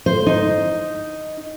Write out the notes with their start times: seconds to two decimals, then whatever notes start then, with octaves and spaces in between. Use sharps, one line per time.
0.06 C5
0.27 D#4